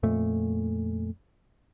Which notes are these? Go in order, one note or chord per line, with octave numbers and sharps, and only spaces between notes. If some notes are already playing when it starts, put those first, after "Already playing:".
F2 A#2 A3